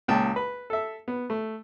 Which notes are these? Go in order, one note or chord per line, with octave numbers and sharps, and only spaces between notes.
C#2 A#2 G5 A5
B4
A4 E5
B3
A3